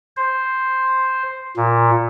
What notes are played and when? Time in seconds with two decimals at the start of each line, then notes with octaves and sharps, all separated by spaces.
0.17 C5
1.57 A#2